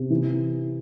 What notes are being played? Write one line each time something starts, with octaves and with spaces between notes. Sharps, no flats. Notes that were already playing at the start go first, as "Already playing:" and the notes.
Already playing: C3
E3